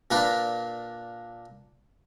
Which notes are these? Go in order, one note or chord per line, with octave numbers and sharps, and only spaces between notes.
A#2 A#3 D4 A#4 B4